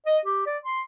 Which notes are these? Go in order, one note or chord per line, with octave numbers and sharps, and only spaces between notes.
D#5
G4
D5
C6